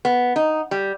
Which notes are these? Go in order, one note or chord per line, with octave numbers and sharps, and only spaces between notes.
B3
D#4
G3